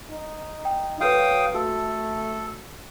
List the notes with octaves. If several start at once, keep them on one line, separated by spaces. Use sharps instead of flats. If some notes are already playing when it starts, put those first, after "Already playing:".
D#4
G5
F#3 F#4 A4 B4 F5 G5 D#6
A3 F#4 A4